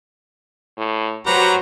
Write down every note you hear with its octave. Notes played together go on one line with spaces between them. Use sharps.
A2
F#3 F#4 G4 B4 C5 A#5